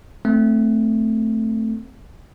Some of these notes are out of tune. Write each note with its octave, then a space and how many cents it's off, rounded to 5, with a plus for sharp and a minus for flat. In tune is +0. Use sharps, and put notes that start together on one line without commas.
A3 +5 C4 +0